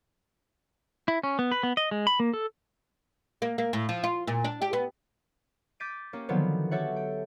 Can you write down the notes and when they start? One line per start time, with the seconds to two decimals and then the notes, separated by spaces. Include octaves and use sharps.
1.08 E4
1.24 C#4
1.39 B3
1.52 B4
1.63 B3
1.77 D#5
1.91 G#3
2.07 B5
2.20 A#3
2.33 A4
3.42 A#3
3.58 A#3
3.73 A2
3.89 F3
4.04 F4
4.27 A#2
4.45 D4
4.62 G4
4.73 B3
5.80 D6 G6 A6 B6 D7 D#7
6.13 A#3 C#4 G4
6.29 D3 D#3 F3 F#3 B3 C4
6.71 F#4 G4 A4 C#5 E5 F#5
6.96 G5